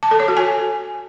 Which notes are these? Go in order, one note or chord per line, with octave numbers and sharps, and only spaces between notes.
A5
A4
C#5
F#4
G#5